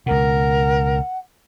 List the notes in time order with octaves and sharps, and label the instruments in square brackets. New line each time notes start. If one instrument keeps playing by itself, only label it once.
[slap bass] C#2 B2 [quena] A#4 [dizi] F#5